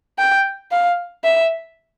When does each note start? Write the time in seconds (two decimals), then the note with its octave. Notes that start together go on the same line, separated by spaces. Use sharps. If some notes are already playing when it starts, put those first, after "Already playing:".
0.18 G5
0.71 F5
1.24 E5